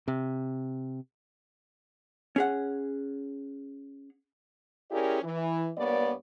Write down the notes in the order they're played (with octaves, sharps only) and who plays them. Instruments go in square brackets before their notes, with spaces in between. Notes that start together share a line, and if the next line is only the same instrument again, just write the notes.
[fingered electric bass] C3
[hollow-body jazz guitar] C#4 G#4 F#5
[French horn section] C#4 E4 G4 G#4 A#4 D5
E3
G2 A#3 B3 C#5 D5